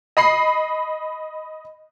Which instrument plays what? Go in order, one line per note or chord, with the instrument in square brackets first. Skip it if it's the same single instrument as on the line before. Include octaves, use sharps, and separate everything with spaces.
[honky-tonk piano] D#5 B5 C7